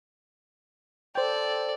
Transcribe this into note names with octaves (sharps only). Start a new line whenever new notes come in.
A4 C5 D5 G5